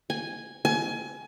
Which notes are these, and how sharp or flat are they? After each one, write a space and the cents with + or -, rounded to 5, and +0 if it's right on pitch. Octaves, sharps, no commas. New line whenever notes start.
G#5 -5
G#5 +25